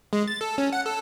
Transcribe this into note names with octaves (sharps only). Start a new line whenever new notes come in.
G#3
A6
A4
C#4
F#5
A4